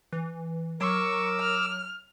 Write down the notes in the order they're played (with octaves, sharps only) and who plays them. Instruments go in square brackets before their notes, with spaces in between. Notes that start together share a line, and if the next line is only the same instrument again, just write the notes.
[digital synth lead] E3
[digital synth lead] F#3 [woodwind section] A#4 [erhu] C#6 [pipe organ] D6 E6
[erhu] F6